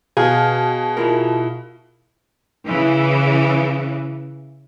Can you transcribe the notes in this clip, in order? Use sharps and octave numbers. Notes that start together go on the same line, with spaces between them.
B2 G#4 F5
E4 F4 A#4
C#3 E3